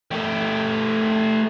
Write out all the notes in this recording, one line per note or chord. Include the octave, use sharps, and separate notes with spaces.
A3 G4